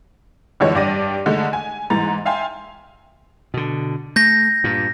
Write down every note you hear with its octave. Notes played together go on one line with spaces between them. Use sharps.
F2 D3 E3 G#3 C#5 D#5
G2 D4 G4 D5 A#6 D#7
D3 G#3 A3 D#4
G#5
G#2 E3 A#5 A6
E5 F5 G5 G#5 C6
B2 D3
A3 G6 A#6
G2 A#2